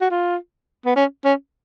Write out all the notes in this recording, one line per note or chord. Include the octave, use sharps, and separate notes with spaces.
F#4
F4
B3
C#4
C#4